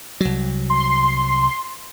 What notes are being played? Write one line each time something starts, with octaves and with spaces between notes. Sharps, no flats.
C2 F#3
C6